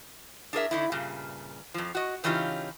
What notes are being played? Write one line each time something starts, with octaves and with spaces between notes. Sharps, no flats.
D4 G#4 A#4 E5
D3 D#4 E4
G2 A#2 C#3
F2 F3
F#4 D#5
C#3 E3 C#4 D#4 F4 G4